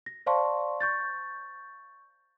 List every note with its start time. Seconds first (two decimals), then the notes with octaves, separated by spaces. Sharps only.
0.06 A#6
0.26 C5 D5 F5 A5 C6 C#6
0.80 C#6 G6 A6